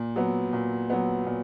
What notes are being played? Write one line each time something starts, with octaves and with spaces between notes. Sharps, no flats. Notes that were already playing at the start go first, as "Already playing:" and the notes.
Already playing: A#2
F#3 B3
A#2
F#3 B3
A#2